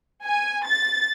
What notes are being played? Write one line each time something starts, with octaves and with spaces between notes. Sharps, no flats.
G#5
A6